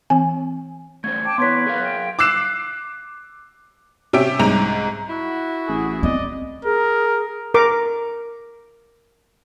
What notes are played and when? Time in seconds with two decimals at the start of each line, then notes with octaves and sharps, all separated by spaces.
0.10 E3 C4 G#5
1.04 A3 C#4 C5 G#6
1.24 G5 A5 D6
1.38 B3 E4 B4 C#5 C6 G#6 B6
1.66 G#4 A#4 F5
1.82 G5
2.19 D6 E6 F#6 C7 E7
4.13 C3 C#4 G4 E5 D7
4.39 C2 G#2 A#5 F7
5.09 E4 F#4
5.68 A1 G#4
6.03 B3 C4 D5 D#5
6.65 G#4 A#4
7.54 A#4 D6